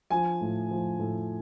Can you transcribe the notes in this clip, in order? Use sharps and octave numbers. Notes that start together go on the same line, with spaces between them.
F3 G#5
A2
F3
A2